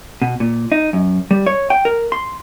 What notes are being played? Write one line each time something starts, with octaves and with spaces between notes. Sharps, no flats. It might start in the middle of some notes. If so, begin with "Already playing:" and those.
B2
A#2
D#4
F#2
G3
C#5
G5
A#4
C6